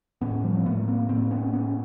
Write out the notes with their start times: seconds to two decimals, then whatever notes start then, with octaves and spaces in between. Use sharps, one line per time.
0.21 A2 B3 C#4
0.44 F3 G3
0.55 C4
0.65 A2 A3 B3
0.88 A#3 C4
1.09 A2 A#3 C4
1.31 B3 C#4
1.53 A2 B3 C#4